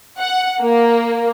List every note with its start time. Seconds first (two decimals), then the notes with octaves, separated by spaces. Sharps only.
0.18 F#5
0.61 A#3